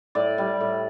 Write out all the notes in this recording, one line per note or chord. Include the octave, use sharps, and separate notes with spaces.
A2 D5
G3
A2